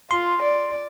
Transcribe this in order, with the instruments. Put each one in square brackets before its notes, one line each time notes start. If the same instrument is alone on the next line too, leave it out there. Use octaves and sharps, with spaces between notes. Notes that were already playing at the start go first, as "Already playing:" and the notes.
[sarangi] F4 [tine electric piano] C6
[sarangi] D5